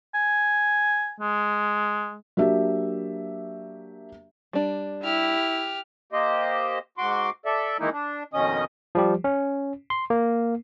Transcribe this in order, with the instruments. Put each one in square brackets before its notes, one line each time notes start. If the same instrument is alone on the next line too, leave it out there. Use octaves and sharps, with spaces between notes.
[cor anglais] G#5
G#3
[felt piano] F#3 A#3 D4 G4 E5
[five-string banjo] G3 D4
[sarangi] E4 [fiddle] G4 F6
[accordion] A#3 G4 C5 D#5
G#2 F#4 C6 D6
A4 D5 E5
D#3 E3 G#3 A#3 D#4 E4
D4
F2 B2 D#3 C#4 D#5 D#6
[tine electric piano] F3 G3 G4
C#4
C6
A#3